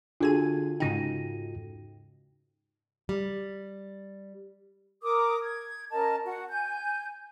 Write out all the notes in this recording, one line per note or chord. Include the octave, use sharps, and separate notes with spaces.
D3 D4 F4 F#4 G#4 A4 G#6 D#7
G#2 C#3 D#4 G5 A#6 D#7
G3
A#4 D6 D#6
G#6
C#4 A#4 D#5 A5
F#4 F#5
G#5 G6